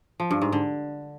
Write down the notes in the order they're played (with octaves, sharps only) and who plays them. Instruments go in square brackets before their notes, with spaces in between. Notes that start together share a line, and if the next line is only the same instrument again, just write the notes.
[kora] F3
G2
G#2
D3